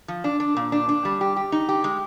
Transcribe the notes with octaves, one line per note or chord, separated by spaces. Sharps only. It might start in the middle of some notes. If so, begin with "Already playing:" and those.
F3
D4
D4
A#2
D4
D4
G3
G4
G4
D#4
G4
G#3